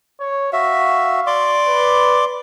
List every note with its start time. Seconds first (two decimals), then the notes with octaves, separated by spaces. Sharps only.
0.20 C#5
0.53 F#4 E5 F5
1.27 D5 C6 D6
1.67 B4